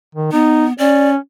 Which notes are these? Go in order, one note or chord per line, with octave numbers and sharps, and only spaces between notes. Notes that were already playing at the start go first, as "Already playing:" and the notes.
D#3
B3 D#4
C#4 D5